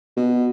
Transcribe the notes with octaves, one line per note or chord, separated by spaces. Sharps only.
B2